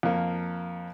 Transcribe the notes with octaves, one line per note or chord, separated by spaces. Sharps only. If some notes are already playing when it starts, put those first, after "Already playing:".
F2 A#3